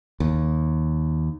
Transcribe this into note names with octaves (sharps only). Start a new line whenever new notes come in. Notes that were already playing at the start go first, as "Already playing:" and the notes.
D#2